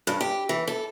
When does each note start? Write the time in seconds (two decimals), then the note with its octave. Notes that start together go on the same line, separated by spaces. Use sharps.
0.07 G2
0.21 G4
0.49 E3
0.68 A4